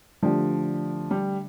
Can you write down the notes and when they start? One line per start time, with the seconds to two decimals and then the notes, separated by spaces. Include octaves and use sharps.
0.23 D3 F3 A3 D4 G4
1.11 G3